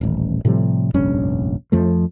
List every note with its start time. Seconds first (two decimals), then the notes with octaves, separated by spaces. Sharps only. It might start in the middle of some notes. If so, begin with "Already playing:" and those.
0.01 D#1 A1
0.45 A2 C3 F3 G3
0.94 F1 A#1 G2 C#4
1.72 F2 F3 A3